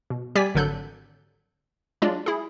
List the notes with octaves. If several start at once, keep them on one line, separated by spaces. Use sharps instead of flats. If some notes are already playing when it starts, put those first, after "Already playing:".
B2
G3 G4 D5 G#5 B6
G#1 D3 F#3 A4 F#6 G6
F#3 G#3 D4 F4 D5
E4 G#4